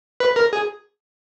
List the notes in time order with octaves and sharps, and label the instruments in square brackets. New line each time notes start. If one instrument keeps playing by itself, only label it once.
[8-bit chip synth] B4
A#4
G#4